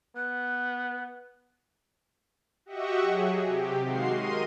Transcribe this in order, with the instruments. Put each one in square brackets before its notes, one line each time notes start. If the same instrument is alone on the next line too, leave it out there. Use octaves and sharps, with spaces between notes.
[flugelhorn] B3 [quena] F#6
[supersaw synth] F#4 G4 D#5 E5 F#5 C#6
F#3 G#4
C3 G4
D#3 G#3 F#4 F5 C6 C7
A#4 D#5 C6 D#7